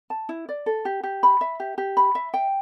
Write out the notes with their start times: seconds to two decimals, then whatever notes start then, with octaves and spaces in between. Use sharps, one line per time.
0.10 A5
0.29 E4
0.49 D5
0.66 A4
0.85 G4
1.03 G4
1.23 B5
1.41 E5
1.60 G4
1.78 G4
1.97 B5
2.15 E5
2.34 G5